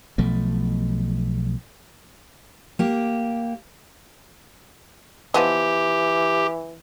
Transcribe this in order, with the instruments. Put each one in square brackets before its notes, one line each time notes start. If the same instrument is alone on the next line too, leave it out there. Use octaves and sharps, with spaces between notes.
[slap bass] B1 B2 F3 A3
[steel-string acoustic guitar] A#3 G4
[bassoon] E3 [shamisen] F3 B3 D#5 [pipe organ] G4